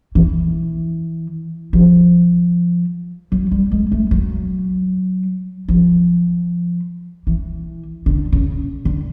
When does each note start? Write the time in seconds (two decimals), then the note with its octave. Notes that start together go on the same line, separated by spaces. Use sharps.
0.15 E3
1.73 F3
3.32 F#3
3.52 G3
3.72 G#3
3.92 A3
4.11 F#3
5.69 F3
7.27 E3
8.06 D3
8.33 C#3
8.85 D3